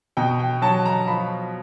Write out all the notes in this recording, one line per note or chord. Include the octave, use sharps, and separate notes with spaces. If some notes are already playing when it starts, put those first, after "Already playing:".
B2 G5
G5
F#3 A5
A#5
F3 B5